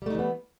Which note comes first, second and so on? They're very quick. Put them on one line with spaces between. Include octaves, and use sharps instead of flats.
G3 A3 D#4 E3 B3